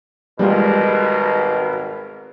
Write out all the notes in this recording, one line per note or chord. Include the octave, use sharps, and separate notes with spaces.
G#1 B2 G3 G#3 F4 A#4